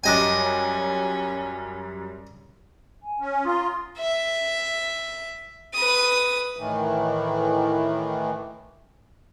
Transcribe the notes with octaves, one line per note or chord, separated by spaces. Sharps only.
F#2 G3 C#4 D4 D#5 G5 G#5
G#5
C#4
F4 A#5 C6 D#6
E5
B4 D#6
A2 D#3 E3